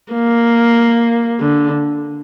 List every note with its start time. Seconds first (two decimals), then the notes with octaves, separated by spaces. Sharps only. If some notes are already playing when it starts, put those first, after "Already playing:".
0.13 A#3
1.40 D3